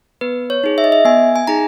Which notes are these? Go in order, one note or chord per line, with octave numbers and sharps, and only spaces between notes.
B3 B4
C#5
D#4 G#4
E5
D#5
E5
B3 G#5
G#5
D#4 G#4 A#5